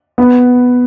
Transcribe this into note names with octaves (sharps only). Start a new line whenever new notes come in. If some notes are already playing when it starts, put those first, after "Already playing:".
B3